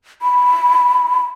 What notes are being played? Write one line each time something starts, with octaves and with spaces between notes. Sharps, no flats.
B5